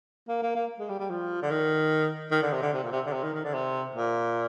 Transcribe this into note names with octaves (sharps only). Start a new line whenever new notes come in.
A#3
A#3
A#3
G#3
G3
G3
F3
D3
D#3
D#3
D3
C3
D3
C3
A#2
C3
D3
C3
D#3
D#3
D3
C3
A#2